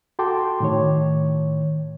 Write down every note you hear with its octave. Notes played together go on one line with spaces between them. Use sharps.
F#4 A4 G5 A5 C6 D6
A2 D#3 C#5